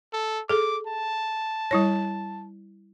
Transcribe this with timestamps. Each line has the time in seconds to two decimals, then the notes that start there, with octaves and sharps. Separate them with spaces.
0.13 A4
0.49 G#4 A4 D6
0.87 A5
1.71 G3 E4 C#5